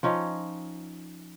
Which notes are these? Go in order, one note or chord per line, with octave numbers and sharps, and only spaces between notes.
F3 C#4 D#4 C#5